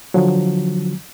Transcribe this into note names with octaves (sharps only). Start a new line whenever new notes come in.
D3 F3 F#3